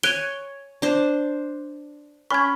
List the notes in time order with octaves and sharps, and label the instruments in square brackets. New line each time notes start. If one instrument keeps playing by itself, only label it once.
[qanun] C#5 G#5 [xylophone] F#6 D7 G7
[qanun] D4 C5
[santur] C#4 B5 [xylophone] C#6 G#6